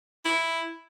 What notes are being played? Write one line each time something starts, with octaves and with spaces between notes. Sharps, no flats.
E4